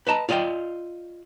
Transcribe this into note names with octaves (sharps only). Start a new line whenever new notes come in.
B4 D#5 A5 A#5
F4 D5 D#5 F5 G5